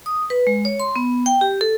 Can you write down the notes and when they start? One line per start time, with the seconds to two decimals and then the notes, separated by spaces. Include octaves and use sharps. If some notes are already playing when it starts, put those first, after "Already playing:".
0.06 D#6
0.30 B4
0.47 G#3
0.65 C#5
0.80 C6
0.96 B3
1.26 G5
1.41 G4
1.61 A4